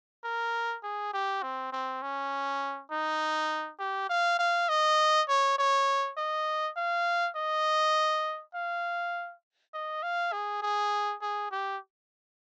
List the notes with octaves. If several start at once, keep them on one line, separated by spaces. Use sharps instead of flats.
A#4
G#4
G4
C4
C4
C#4
D#4
G4
F5
F5
D#5
C#5
C#5
D#5
F5
D#5
F5
D#5
F5
G#4
G#4
G#4
G4